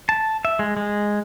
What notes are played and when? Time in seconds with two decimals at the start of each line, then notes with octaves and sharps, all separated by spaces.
0.09 A5
0.45 E5
0.59 G#3
0.77 G#3